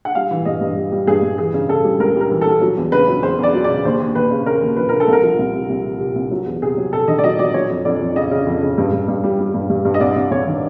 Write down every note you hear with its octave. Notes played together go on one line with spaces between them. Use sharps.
F#5
G3 F5
E3
G2 D#5
G2
G3
G3
G2 G#4
G2
E3 G#4
C#3
C#3 A4
G3
C#2 A#4
G3
A#4
E3
A4
G3
F#3
E2
C#3 B4
F#3
E2 C5
E2 D5
F#3
D5
C#3
D#2 C5
D#2
D#2 B4
C#3
C#3 A#4
D#2
F3 B4
C#3 A#4
A4
C2
A#4
F3
C2
C3
C2
C3
C3
C2
F#3
E2
C3 G#4
F#3
C3 A4
D#3 D#5
D5
F#3 D#5
F#3 D5
F#3 C#5
F2
F2 D5
F2
C#3 D#5
C#3
F2
C#3
G2
G2
G2
G3
G3
G2
G2
G2
D#5
C2 D5
C2
C2 C#5
D#3